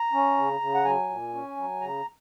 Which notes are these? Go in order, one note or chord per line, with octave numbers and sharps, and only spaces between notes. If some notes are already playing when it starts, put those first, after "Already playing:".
Already playing: A#5
C#4
C#3
C#3
F#5
F#3 G#5
A#2
C#4
F#3
C#3 A#5